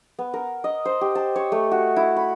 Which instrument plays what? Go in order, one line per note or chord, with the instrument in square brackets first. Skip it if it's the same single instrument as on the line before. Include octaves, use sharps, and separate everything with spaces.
[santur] B3
A#4
D#5
C5
G4
A5
C#5
A3
F#4
E4
B5